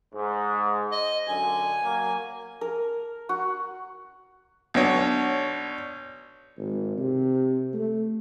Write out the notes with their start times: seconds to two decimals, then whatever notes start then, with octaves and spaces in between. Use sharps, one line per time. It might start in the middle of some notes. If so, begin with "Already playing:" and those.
0.15 G#2
0.92 D#5
1.28 F#2 D3 G#5
1.83 F#3 A#3
2.61 A#4
3.29 F#4
4.74 B1 D4 C#5
6.58 G#1
6.98 C3
7.73 A3